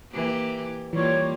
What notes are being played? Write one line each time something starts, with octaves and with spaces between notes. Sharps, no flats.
E3 A#3 G4
E3 G3 A#3 F4 C#5